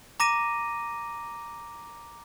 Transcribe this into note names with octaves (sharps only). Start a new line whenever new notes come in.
A#5 D6 A#6 D#7